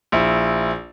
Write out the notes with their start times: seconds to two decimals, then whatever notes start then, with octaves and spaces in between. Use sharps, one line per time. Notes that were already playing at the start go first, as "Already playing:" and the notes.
0.12 A#1 E4